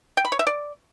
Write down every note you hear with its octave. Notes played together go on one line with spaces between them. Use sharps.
G5
B5
C#5
E5
D5